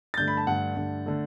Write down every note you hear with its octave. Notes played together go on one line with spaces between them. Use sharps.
A6
G2 D3 A3 G6
B5
A5
G2 D3 A3 F#5
G2 D3 A3
D3 A3